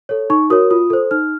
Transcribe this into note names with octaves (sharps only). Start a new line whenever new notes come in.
A4 C#5
D#4 C#6
F#4 A#4 C#5 D#6
F4 D#6
A4 C5
D#4 F6